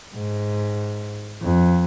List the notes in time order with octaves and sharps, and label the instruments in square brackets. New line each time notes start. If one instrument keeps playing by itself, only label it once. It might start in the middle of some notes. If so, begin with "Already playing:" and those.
[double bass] G#2
F2